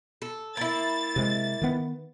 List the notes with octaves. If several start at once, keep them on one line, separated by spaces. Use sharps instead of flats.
A4
A#3 E4 A6
C3 G#3
D#3 B3